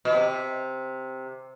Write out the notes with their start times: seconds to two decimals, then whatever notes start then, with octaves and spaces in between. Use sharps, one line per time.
0.05 B2
0.13 C3